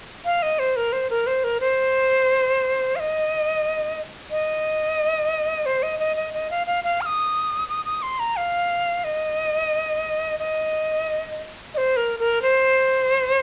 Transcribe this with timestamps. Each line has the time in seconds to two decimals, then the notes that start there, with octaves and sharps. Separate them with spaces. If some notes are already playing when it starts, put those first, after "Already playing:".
0.25 F5
0.42 D#5
0.59 C5
0.76 A#4
0.93 C5
1.10 A#4
1.27 C5
1.44 A#4
1.60 C5
2.96 F5
3.00 D#5
4.31 D#5
5.66 C5
5.83 D#5
6.00 D#5
6.16 D#5
6.34 D#5
6.50 F5
6.67 F5
6.84 F5
7.01 F6
7.06 D#6
7.69 D#6
7.86 D#6
8.02 C6
8.19 A#5
8.36 F5
9.04 D#5
10.39 D#5
11.74 D#5
11.78 C5
11.97 A#4
12.19 A#4
12.42 C5